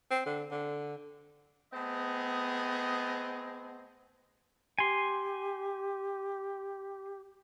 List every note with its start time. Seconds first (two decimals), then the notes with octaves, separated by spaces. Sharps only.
0.11 C4
0.26 D3
0.51 D3
1.73 A3 B3 C4 G#4 D#5
4.79 G4 G#5 C6